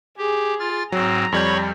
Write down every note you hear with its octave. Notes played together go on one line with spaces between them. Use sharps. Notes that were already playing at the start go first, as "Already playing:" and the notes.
G4 G#4
F4 F6 A6
G#2 F#3 C4 A#5
F2 G3 C#5 B5 C#6 G6